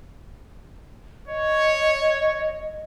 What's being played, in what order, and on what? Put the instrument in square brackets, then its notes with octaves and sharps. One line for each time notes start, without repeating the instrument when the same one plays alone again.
[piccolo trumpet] C#5 [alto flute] D#5